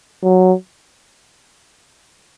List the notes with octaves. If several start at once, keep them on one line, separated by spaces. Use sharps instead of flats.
F#3